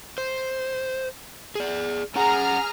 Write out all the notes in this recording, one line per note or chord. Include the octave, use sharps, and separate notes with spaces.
C5
G#4 D5
C#4 G#4 F#5 A#5 F6